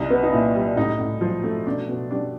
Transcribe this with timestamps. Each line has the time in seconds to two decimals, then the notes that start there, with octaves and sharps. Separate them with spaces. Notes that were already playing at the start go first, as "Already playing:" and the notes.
Already playing: C2 D#4
0.10 B3
0.23 D#4
0.32 A#2 E4
0.55 G3
0.76 A2 D#4
0.99 A2
1.21 F3
1.44 A3
1.66 B2 D4
1.89 B2
2.11 G3 D4